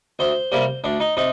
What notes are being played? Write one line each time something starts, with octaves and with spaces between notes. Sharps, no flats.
D2 C5
C3 G3 A#3
D2 D4
D#4
C3 D#4